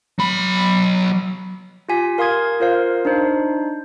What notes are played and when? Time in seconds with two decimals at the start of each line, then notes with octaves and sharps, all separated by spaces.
0.19 F#3 B5
1.89 F4 G4 G#5 B6
2.18 A#4 F5 C6 D#6 G#6
2.60 F4 A#4 C5 F5
3.05 D4 D#4 C5